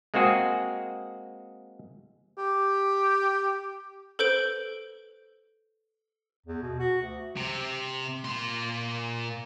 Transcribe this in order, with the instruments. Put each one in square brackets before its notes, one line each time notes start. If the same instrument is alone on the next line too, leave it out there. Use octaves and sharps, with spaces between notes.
[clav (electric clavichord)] G#3 A#3 C4 F#4 G#4
[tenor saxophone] G4
[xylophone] A4 B4 C5 G6 D7 F#7
[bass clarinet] E2
B2
F#4
D2
[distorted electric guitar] C3
A#2 C6